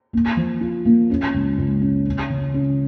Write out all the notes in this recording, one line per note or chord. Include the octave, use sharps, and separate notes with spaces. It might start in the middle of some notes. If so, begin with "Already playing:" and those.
A#3
F3
F4
A#3
C#4
C#2
C#2
C#4
C#4
C#3
C#4